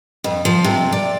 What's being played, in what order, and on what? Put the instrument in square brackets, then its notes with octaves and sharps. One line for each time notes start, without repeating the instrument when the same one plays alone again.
[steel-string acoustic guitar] F2
F3
C3
D5